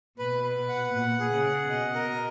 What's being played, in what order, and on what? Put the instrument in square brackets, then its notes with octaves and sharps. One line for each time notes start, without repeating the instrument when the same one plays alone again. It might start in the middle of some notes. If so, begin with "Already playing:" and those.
[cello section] B2 [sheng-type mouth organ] B4
[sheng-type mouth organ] B4
F#5
[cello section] A#2 [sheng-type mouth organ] F#5
[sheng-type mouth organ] G#4
[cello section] C#3
[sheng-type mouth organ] F#5
[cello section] B2 [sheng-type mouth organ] D#5
[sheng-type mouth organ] A#4